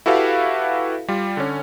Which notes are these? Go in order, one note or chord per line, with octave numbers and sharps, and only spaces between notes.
E4 F#4 G4 A4 B4 F5
G3 F4
D3 C#4